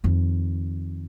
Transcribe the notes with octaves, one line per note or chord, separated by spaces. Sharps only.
F2 D#3